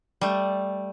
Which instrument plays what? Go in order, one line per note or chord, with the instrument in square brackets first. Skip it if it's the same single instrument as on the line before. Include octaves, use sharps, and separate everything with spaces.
[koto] G3 A3